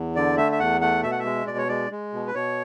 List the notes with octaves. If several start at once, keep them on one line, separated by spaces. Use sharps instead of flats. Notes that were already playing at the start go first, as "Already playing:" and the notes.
Already playing: E2
D3 D5
A3 E5
E5
E2 F#5
A3 F#5
B2 E5
F#5
E5
G#3
B2 D5
C#5
G#3 D5
G#3
B2
B4
B2 C#5